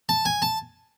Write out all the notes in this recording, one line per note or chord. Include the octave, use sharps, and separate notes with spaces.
A5
G#5
A5